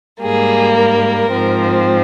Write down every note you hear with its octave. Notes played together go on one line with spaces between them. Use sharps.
G#2 G3 A#3 G#4
A#4
G#2 F3 C4